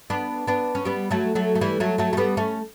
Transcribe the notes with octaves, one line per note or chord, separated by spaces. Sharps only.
B3 D4
B3 D4
C#4
G3 B3
F#3 A3
F#3 A3
A3
E3 G3
F#3 A3
F#3 A3
A3
G3 B3
A3 C#4